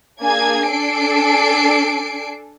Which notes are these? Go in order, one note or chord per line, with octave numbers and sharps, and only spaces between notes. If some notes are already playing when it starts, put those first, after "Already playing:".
A#3 D4 G#4 G#5 G#6
D4 A4 G#5 C7 D7